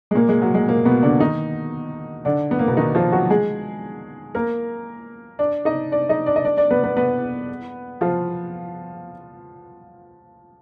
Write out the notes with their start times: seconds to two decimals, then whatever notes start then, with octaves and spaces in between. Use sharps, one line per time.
0.11 G#3
0.15 A#2 A#3
0.29 G#3
0.42 F#3
0.54 G#3
0.68 A#2 A#3
0.85 B2 B3
1.03 D3 D4
1.20 D#3 D#4
2.25 D3 D4
2.51 B3
2.59 A#3
2.68 B2 B3
2.77 D#3 D#4
2.95 F3 F4
3.12 F#3 F#4
3.30 G#3 G#4
4.35 A#3 A#4
5.39 D4 D5
5.65 D#4 D#5
5.91 D4 D5
6.09 D#4 D#5
6.26 D4 D5
6.36 D#5
6.44 D4 D5
6.57 D4 D5
6.71 B3 B4
6.83 B3 B4
6.96 B3 B4
8.01 F3 F4